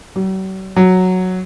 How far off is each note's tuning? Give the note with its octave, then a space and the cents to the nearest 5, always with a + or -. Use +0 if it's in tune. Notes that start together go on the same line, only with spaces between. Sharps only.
F#3 +45
F#3 -5